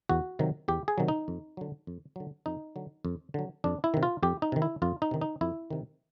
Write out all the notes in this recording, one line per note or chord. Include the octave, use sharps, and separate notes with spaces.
E2 F#4
C3 D#3 F#3
E2 G4
G#4
C3 D#3 F#3
D#4
F2
D3 F#3
F2
D3 F#3
F2 D#4
D3 F#3
F2
D3 F#3
F2 D4
E4
C3 D#3
F4
F2 G4
D#4
C3 D#3
E4
F2 F4
D#4
C3 D#3
D#4
F2 E4
C3 D#3